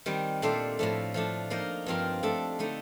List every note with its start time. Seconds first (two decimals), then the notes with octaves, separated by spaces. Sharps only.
0.06 D#3 G3 C4
0.42 A#2 A3 D4 A4 C5
0.79 A2 F3 A3
1.14 F3 A3 D4
1.50 F3 A#3 D#4 A#4
1.86 G2 F3 C4 F4 A#4
2.23 F3 A3 D4 A4
2.59 D3 A3 D#4